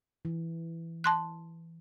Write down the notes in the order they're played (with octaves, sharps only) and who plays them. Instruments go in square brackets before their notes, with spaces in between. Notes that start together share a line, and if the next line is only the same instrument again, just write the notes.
[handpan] E3
[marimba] A5 C6 F#6